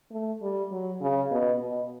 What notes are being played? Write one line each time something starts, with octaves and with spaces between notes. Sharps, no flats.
A3
G3
F#3
C#3
B2
B2